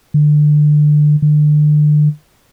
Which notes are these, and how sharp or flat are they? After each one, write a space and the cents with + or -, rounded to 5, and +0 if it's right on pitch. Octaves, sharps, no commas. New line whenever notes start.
D3 +25
D3 +35